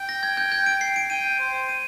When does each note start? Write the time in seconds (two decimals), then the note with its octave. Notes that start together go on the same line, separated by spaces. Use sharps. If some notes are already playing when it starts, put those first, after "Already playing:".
Already playing: G5
0.09 A#6
0.23 G#6
0.37 G6
0.52 G6
0.66 D7
0.81 C7
0.96 D7
1.10 G5 D#7
1.39 C5
1.69 D#7